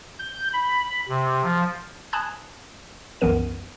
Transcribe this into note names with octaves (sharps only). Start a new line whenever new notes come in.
G6
B5
C3
F3
G#5 A5 B5 D#6 F#6 G#6
C2 F#2 E3 B3 A#4 D#7